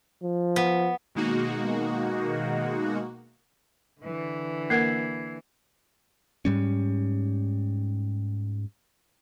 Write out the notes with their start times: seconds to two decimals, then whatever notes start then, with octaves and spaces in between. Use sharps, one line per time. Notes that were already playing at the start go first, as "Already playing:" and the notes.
0.23 F3
0.56 B3
1.15 B2 D#3 G#3 A#3 D#4 F#4
4.01 D3 E3
4.70 A#3 A#4 F#5 G#6 C7
6.45 G#2 G3 C#4